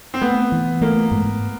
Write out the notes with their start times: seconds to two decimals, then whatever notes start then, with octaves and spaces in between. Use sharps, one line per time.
0.14 C4
0.21 A3 B3
0.52 E3
0.81 A3 A#3
1.11 G#2